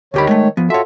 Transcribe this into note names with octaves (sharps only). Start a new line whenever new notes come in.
D2 D#3 G4 C#5 B5
G#3 A3
F3 B3
F4 F#4 A4 C#5 E5